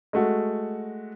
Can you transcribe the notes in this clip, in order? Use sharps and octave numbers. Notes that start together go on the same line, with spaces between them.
G#3 A3 F#4